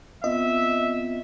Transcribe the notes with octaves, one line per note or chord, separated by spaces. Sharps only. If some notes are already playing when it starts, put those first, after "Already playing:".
B3 C4 F4 D#5 E5